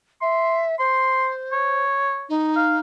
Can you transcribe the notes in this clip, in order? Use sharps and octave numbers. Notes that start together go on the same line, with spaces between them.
E5 C6
C5 C6
C#5
D#4
F5